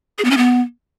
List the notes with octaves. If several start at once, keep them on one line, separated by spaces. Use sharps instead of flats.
G#4
B3
C#4
B3